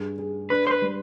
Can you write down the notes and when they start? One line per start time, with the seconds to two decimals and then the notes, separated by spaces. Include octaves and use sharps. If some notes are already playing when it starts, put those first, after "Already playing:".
Already playing: G2 G#4
0.18 G#4
0.50 D4 B4
0.67 C5
0.71 B4
0.82 G3